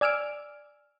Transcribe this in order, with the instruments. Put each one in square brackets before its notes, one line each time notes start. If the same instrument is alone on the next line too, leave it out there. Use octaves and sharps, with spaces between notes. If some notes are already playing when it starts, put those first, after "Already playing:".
[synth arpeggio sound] D5 G#5 E6 F6 D7